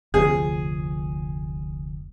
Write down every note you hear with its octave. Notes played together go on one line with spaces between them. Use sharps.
F1 D2 F3 G#4